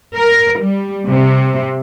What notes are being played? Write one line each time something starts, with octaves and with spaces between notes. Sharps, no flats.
A#4
G3
C3